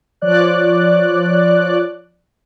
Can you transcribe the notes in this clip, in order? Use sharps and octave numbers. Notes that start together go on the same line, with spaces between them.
F3 C#5 D5 F#6